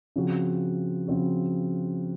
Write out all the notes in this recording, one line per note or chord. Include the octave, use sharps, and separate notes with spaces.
C#3 F3 C4 F#4
C#3 F3 C4 F#4